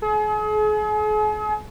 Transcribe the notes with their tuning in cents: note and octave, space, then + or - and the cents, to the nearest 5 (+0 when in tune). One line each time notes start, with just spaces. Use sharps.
G#4 +40